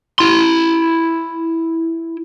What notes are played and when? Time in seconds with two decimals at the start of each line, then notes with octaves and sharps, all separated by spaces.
0.19 E4 C6